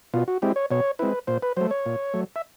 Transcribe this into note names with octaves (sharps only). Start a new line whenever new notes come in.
B2 F4
F#4
G#3 C4 E4 G4
C#5
B2 C#5
G#3 C4 E4 B4
A#2 C5
B4
F#3 A3 C5
C#5
A#2
F#3 A3
E5